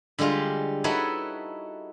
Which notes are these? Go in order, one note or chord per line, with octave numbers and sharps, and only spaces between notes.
D3 G3 G#3 F4 G4
D#4 E4 F#4 A4 B4 C#5